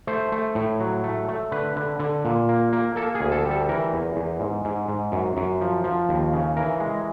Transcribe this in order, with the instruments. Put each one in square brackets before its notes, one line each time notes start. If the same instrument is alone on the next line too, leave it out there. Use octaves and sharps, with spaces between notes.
[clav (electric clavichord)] A3 C5
A3
A2
F#3
A3
A3
D3 B4
D3
D3
A#2
A#3
A#3
A#3 A4
G#4
D2
A4
G3
A4
E3 A#4
E2
E2
G#2
G#2
G#2
F#2
F#2
F3
F3
D#2
C#3
E3 A#4
G#3